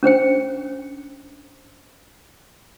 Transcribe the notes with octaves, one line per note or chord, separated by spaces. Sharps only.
C#4 D4 C5 G5